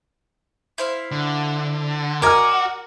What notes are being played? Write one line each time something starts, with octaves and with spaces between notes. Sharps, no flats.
E4 C5 F5
D3
F#4 A#4 D5 D#5 G#5 A#5 F6